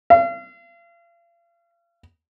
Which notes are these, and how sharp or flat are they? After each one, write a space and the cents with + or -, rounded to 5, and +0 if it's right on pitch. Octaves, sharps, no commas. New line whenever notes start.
F5 -40